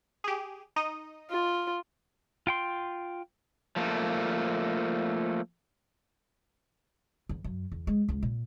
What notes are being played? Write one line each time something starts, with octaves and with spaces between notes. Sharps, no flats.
G4 G#4
D#4 D#5 D#6
F4
F4 G5 C6
F3 A3 A#3
E2
F#2
E2
G#3
C#2
A#2